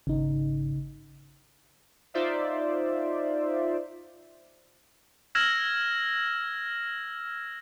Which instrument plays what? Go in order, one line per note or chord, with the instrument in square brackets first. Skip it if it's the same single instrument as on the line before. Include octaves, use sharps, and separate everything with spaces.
[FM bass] G#1 [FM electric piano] C#3 D#4
[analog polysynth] D#4 F4 C5 D5 E5
[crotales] E6 F6 G#6 A#6 E7 F#7